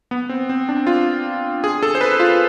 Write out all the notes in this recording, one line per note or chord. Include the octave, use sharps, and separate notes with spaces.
B3
C4
C4
D4
F4
G#4
A4
C5
B4
F4